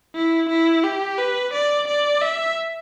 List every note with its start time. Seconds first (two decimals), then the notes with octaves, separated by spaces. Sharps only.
0.15 E4
0.50 E4
0.84 G4
1.18 B4
1.54 D5
1.88 D5
2.22 E5